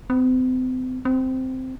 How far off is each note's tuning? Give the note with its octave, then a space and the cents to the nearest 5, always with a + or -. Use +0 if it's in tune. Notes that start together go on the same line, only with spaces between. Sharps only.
C4 -40
C4 -10